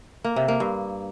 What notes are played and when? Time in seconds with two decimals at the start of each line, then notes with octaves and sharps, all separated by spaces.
0.24 A#3
0.36 C3
0.48 A#3
0.60 G2